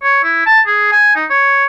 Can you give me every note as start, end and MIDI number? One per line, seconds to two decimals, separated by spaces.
0.03 0.20 73
0.23 0.43 64
0.46 0.60 81
0.67 0.87 68
0.92 1.15 80
1.16 1.25 63
1.30 1.65 73